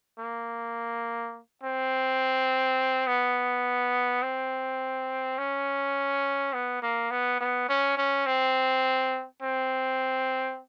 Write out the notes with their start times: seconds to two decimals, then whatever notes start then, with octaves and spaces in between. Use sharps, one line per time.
0.19 A#3
1.63 C4
3.07 B3
4.23 C4
5.38 C#4
6.54 B3
6.83 A#3
7.11 B3
7.41 B3
7.69 C#4
7.98 C#4
8.27 C4
9.42 C4